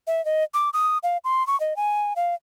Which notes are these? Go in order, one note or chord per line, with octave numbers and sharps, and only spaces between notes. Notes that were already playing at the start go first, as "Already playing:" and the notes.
E5
D#5
D6
D#6
F5
C6
C#6
D#5
G#5
F5